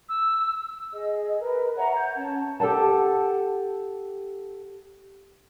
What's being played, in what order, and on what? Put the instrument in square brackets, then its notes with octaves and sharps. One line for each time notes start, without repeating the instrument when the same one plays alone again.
[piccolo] E6
[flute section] G#4 D#5
A#4 B4
C#5 E5 F#5 A#5
A#5 G6 G#6
C#4 A5
[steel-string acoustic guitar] G4 A4 B4 F#5 A5